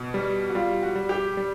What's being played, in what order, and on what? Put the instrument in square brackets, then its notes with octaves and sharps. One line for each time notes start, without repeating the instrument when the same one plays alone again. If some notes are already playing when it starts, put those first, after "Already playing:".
Already playing: [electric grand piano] B2
G3
[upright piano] F#4
[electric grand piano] G3 [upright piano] F4
[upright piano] F#4
[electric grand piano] G3
[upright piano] G4
[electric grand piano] G3